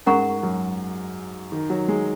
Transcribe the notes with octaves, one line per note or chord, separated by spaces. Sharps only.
G#2 C#4 A#4 F#5 A#5 C#6
F#2
D#3
F#3
G#3